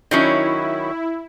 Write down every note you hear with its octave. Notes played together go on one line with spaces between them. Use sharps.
D#3 F#3 C#4 E4